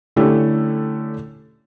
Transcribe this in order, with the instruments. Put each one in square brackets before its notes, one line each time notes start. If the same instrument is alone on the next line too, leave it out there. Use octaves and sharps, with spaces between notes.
[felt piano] D3 A3 C#4 E4 G4 A4